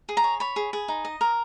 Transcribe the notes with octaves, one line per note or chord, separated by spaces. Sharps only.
G#4
A#5
C#5
C#5 B5
G#4
G#4
D#4
D#5
A#4